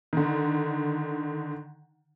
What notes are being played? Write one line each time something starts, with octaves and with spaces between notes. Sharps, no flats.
D3 D#3